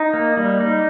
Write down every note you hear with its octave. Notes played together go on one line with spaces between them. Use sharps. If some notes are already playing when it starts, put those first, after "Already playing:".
Already playing: D#4
A#3
G3
D#4